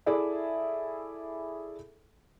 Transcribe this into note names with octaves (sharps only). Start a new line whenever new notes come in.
E4 G#4 A4 D5 E5